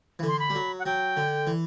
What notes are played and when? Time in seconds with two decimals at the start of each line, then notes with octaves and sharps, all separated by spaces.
0.19 E3
0.23 D3
0.28 C6
0.39 B5
0.50 G3
0.55 F#3
0.79 F#5
0.86 F#3 G5
1.17 D3
1.47 E3